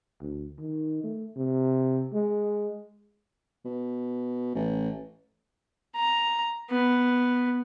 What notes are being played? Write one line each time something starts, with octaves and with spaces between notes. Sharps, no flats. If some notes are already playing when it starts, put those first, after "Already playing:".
D2
D#3
A3
C3
G#3
B2
A1
A#5
B3